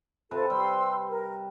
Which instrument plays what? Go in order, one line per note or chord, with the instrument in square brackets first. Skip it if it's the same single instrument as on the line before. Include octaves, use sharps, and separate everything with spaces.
[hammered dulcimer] C3 B4 A5 [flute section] F4 A4
[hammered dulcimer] G3 [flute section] C5 C6 E6
[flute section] A#4